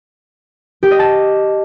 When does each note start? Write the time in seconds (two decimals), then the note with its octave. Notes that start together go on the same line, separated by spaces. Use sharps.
0.83 G4
0.91 D#5
0.99 A5